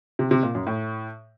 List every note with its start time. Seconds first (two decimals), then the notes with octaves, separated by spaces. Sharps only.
0.19 C3
0.31 C3
0.43 A#2
0.55 F#2
0.67 A2